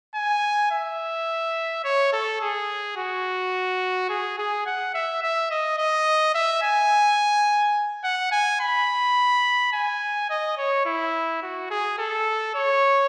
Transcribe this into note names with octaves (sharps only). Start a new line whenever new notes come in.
G#5
E5
C#5
A4
G#4
F#4
G#4
G#4
F#5
E5
E5
D#5
D#5
E5
G#5
F#5
G#5
B5
G#5
D#5
C#5
E4
F#4
G#4
A4
C#5